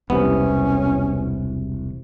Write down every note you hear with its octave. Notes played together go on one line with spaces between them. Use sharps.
E1 C2 C3 B3 C#4